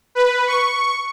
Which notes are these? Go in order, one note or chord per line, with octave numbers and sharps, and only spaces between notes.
B4
C#6